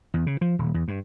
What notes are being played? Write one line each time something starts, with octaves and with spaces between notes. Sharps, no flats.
E2
C#3
F3
D#1
E2
G2